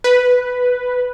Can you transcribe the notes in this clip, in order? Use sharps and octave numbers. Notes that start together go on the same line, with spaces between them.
B4